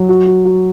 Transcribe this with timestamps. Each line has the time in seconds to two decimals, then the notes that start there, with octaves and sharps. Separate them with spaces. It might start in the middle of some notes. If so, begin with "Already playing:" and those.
Already playing: F#3
0.09 F#4
0.27 F#4
0.45 F#4